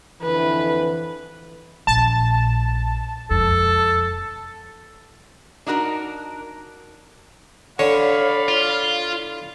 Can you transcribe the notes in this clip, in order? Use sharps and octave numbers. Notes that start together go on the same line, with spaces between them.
F2 D3 E3 B4
A#1 A5
E1 F2 A4
D4 D#4 F#4 A#4
D3 C#5 D5 F5 B5
F4